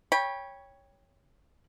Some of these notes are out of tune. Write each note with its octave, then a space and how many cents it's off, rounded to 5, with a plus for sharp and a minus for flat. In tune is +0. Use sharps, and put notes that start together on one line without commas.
C#5 +0 G5 +20 B5 -20